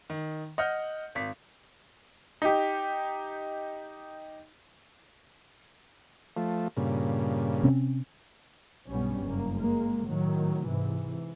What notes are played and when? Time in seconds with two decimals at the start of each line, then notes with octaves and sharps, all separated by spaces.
0.10 D#3
0.58 D#5 F#5 F6 G6
1.15 G#1 B6
2.42 D#4 G4
6.37 F3 A3
6.77 G2 A#2 C#3
7.63 C3 C4 C#4
8.88 B1 G2 G3 B3 C#4
9.24 F#1 A#3
9.57 G#3 A#3
10.05 A2 D#3 F#3
10.66 G#2 C3 E3